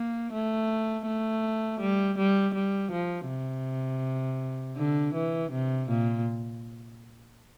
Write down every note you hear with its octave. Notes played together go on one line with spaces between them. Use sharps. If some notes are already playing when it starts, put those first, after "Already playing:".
Already playing: A#3
A3
A3
G3
G3
G3
F3
C3
D3
E3
C3
A#2